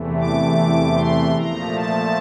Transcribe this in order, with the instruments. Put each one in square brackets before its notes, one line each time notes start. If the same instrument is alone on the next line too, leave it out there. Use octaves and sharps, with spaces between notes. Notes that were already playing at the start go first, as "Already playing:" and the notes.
Already playing: [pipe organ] E2 C3 E3 A3
D6
C6
A#2 F3 A3 A#5
A5